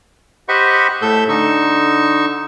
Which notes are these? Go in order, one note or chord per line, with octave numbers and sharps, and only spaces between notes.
G4 C5 D#5 F#5 B5 C#6
A2 A3 A4 E6 G6
D3 D#4 C#6 E6